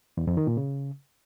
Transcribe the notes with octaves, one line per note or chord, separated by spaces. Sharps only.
E2
F2
D#3
A#2
C#3